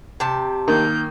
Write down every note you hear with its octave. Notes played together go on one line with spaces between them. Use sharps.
C3 G4 A5
D#3 A#3 A#4 G6